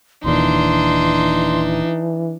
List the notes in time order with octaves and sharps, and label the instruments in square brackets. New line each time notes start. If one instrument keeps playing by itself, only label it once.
[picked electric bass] D#1 D#2 A#2 [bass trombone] E3 [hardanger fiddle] D4 D#4 [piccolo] C6